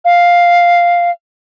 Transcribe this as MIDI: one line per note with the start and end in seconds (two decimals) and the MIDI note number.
0.05 1.11 77